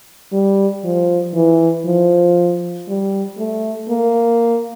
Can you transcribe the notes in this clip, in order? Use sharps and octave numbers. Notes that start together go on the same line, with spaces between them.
G3
F3
E3
F3
G3
A3
A#3